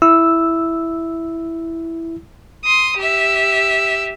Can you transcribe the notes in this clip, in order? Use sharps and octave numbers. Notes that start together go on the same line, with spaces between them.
E4 E6
C6 D#6
G4 E5